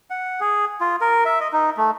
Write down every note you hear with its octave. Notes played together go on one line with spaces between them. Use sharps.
F#5
G#4
F4
A#4
E5
D#5
D#4
A3